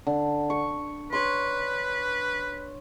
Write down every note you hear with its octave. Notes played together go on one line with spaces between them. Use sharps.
D3
C#6
B4 C#5 C6